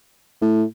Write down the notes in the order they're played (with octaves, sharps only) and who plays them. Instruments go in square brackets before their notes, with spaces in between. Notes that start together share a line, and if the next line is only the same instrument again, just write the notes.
[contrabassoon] A2